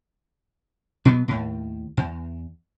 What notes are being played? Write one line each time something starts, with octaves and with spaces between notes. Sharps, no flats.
B2 F#3 B3
D#2 A2
E2